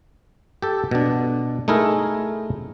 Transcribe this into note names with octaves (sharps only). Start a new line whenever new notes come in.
G4 A4
B2 D4
A3 D#4 E4 G#4 A#4